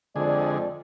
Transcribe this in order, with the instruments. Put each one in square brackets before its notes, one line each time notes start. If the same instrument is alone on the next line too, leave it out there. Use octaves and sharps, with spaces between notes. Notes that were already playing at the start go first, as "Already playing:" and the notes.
[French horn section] F2 G#3 D5 [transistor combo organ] D3 G#4